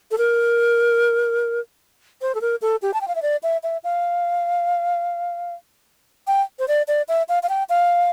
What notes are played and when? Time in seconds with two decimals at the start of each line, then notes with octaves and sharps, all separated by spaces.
0.11 A4
0.18 A#4
2.22 C5
2.35 A4
2.41 A#4
2.62 A4
2.82 G4
2.94 A5
3.01 G5
3.08 F5
3.15 E5
3.22 D5
3.43 E5
3.63 E5
3.84 F5
6.27 G5
6.59 C5
6.68 D5
6.88 D5
7.08 E5
7.29 F5
7.43 F5
7.49 G5
7.69 F5